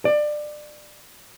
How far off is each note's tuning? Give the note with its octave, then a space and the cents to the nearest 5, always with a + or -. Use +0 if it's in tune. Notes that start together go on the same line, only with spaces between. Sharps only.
D5 +25